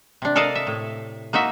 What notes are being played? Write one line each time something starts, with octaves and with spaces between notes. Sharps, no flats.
C3 D4
A4 A#4 D5 D#5 F5 A5
E5
A2
A#3 D#4 F#4 E5